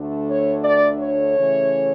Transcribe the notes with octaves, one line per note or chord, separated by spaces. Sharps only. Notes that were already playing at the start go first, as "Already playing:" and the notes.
Already playing: D2 D3 A3 D4
C#5
D5
C#5
C#3 E3 A3 C#4